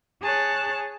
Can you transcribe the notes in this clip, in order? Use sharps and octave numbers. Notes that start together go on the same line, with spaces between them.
G#4 C#5 A5 F#6